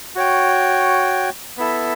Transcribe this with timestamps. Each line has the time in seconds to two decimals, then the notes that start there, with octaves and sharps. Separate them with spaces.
0.15 F#4 C#5 G5
1.57 B3 E4 A4 E5